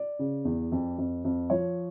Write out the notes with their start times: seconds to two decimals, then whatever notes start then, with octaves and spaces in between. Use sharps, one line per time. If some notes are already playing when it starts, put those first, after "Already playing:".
Already playing: D5
0.19 C#3
0.45 E2
0.72 F2
0.98 F2
1.24 F2
1.50 F3 C#5